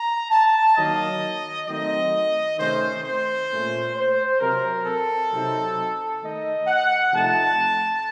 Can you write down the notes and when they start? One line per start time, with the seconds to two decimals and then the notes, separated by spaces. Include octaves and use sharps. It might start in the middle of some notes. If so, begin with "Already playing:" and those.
Already playing: A#5
0.31 A5
0.76 D#3 F#3 A#3 D#5
1.67 D#3 F#3 A3 C4 D#4 D#5
2.57 C3 D#3 A3 C#4 C5
3.03 C5
3.49 A#2 A3 C#4
3.95 C5
4.40 C3 F#3 C4 A#4
4.85 A4
5.31 C3 F#3 C4 D#4
6.21 D#3 A3 D#4 D#5
6.67 F#5
7.13 C3 F3 A3 D#4 A5